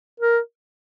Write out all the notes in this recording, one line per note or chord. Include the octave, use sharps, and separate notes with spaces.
A#4